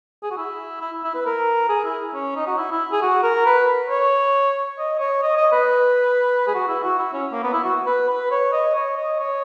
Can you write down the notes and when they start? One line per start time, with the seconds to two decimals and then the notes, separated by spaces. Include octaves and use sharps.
0.23 G#4
0.31 F#4
0.37 E4
0.81 E4
1.03 E4
1.15 B4
1.26 A#4
1.69 G#4
1.84 E4
2.14 C#4
2.36 D#4
2.47 F#4
2.58 E4
2.72 E4
2.92 G#4
3.02 F#4
3.23 A#4
3.46 B4
3.90 C#5
4.79 D#5
4.99 C#5
5.23 D#5
5.37 D#5
5.52 B4
6.48 G#4
6.55 F#4
6.68 E4
6.83 F#4
6.99 E4
7.13 C#4
7.32 A#3
7.43 B3
7.53 E4
7.64 F#4
7.87 B4
8.09 B4
8.31 C#5
8.52 D#5
8.75 C#5
8.97 D#5
9.19 C#5